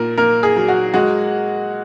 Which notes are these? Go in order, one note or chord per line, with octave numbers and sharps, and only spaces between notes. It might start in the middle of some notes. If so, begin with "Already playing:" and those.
Already playing: A#2 A#4
A#3 A#4
G#4
F#3
F#4
G#3 F#4